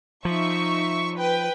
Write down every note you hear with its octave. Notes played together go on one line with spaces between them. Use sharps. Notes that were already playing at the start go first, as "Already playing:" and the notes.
F3 D#4 E5 C#6
B4 G5